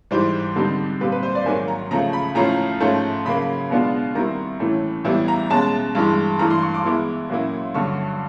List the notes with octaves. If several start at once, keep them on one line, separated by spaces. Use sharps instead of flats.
G#2 E3 G3 C5
D3 G3 C4 D#4
A#2 G3 C4 B4
B4
C5
D5
G#2 D#3 F#3 A#3 G#5
A#5
C#3 F3 A3 A#5
B5
A2 F3 A3 C#4 F4 A#5
G#2 F3 A3 C#4
C#3 F#3 A#3 B5
B2 G#3 B3 D4 F4
D#3 G3 C4 E4 A#5
A2 E3 A3 C#4
A2 E3 G3 B3 E4
A#5
B2 G#3 C#4 A5
G2 E3 G#3
G2 E3 A3 A#5
C6
C#6
D6
E3 G#3 B3 E4
A#2 F#3 A#3 C#4 E4
G2 D3 F#3 C#6